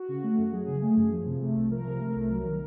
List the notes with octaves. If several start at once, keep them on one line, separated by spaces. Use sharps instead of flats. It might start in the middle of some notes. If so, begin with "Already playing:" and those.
Already playing: F#4
C#3
A3
F#2
F#3 G#4
C#3
A3
F#2
F3
C3
A3
C2
F3 A#4
C3
A3
C2
F#3
D#3